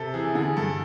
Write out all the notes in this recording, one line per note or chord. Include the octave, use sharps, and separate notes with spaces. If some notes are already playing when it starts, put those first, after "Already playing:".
Already playing: C3 A4
E3 G#4
D3 G#4
G2 A4